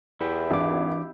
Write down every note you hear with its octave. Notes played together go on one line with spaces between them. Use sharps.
E2 E4 G4
G#1 E3 D4 D6